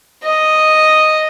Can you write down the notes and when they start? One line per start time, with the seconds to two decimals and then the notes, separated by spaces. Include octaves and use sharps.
0.24 D#5